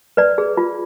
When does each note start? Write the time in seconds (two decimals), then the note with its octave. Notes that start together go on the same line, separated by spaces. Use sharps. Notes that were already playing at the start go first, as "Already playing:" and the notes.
0.17 B4 D5
0.38 G#4
0.57 F4